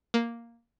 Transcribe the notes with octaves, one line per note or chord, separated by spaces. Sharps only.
A#3